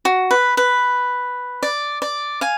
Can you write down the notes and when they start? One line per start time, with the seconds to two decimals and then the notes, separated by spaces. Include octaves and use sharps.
0.05 F#4
0.31 B4
0.57 B4
1.63 D5
2.02 D5
2.41 F5 G#5